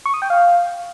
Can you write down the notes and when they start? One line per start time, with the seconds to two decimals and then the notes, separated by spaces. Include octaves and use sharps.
0.06 C#6
0.14 D#6
0.22 G5
0.30 F5